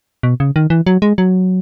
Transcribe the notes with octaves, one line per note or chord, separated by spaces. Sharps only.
B2
C#3
D#3
E3
F#3
G#3
F#3